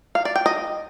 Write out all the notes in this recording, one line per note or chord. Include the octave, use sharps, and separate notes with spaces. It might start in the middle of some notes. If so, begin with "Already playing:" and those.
F5
D5
G5
D#5